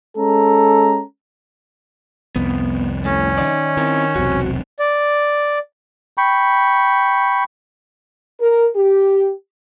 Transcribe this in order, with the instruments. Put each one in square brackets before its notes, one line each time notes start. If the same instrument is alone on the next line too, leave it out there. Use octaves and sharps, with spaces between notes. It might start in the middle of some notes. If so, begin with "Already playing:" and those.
[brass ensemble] G#3 C#4 A4 A#5
[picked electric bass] C2 F2 [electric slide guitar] B3
[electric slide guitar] A2 [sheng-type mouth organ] C#4
[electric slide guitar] D#3 D#4 D5
[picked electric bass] D#3 [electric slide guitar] C4 D#4 E4
[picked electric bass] E1 B1 C3 [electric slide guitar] F#4
[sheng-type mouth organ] D5
[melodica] G5 B5 C#6
[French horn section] A#4
G4